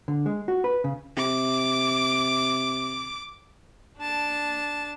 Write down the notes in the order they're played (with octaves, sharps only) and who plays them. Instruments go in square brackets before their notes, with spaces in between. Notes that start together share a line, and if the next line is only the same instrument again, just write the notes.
[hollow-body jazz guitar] D3
G#3
F#4
B4
C#3
[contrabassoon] C3 [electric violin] D6
[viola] D4 A5